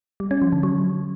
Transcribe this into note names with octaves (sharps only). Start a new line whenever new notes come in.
G3
C#4
F3
D3
F#3